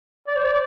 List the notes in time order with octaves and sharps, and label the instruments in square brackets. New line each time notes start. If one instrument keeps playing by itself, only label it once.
[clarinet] D5
C5
D5